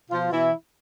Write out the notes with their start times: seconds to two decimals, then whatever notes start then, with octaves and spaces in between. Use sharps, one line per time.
0.10 B2 F3 F4
0.32 B2 E3 E4